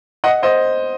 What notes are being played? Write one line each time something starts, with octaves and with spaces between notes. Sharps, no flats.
D#5 F#5
C5 D#5